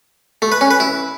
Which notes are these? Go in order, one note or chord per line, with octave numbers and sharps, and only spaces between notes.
A3
B4
C#4
B4
E4